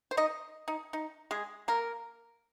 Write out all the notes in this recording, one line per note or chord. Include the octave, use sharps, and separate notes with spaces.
C5
D#4 D#5
D#4
D#4
G#3 G#4
A#3 A#4